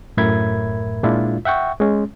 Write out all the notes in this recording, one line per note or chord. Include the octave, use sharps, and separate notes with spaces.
F#2 A2 A#4 E5 B5 G#6
A#2 G#3 D4 E4 F4
E5 F#5 G5 C#6
G#3 C#4